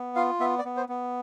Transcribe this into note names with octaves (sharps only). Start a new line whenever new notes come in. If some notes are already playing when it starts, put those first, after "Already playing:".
Already playing: B3
F4 F5
B3 E5
D5
B3
C5
B3